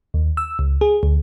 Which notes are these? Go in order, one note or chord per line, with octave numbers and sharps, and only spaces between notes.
D#2
E6
C#2
G#4
D2